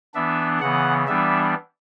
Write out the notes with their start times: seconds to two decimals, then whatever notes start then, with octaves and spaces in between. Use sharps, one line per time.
0.14 E3 B3 D4 E5
0.60 C#3 E3 B3 F#5
1.07 E3 G3 B3 D4 E5